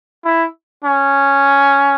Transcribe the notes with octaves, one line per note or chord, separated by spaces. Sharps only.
E4
C#4